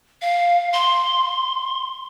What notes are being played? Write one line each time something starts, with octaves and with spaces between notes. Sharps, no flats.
F5
C6